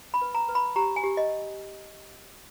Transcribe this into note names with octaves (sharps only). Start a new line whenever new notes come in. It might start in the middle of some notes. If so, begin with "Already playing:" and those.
B5
B4
A#5
B4
B5
G4 A#5
G#5
G4
D#5